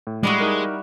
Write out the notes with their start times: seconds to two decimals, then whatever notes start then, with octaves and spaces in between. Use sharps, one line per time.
0.07 A2
0.23 G3 G#3 E4 F#4
0.40 D#4 A#4